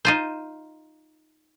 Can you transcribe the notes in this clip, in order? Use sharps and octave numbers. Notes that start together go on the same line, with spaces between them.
D#4 F4 C5